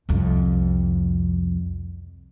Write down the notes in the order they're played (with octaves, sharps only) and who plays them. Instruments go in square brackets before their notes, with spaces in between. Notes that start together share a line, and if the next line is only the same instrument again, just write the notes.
[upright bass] C2 F2